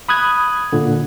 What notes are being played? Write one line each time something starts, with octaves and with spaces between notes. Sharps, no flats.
B5 D#6 F#6 G#6
A#2 D3